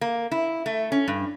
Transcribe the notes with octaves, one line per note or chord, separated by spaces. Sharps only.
A#3
E4
A3
C#4
G2